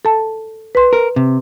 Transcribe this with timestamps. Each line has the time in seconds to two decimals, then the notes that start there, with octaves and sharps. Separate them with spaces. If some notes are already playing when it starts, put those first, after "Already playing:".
0.05 A4 A5
0.75 B4 C6
0.93 A#4
1.16 C3